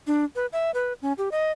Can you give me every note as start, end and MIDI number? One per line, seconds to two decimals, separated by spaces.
0.07 0.24 62
0.36 0.46 71
0.53 0.71 76
0.74 0.93 71
1.02 1.13 61
1.18 1.29 67
1.32 1.52 75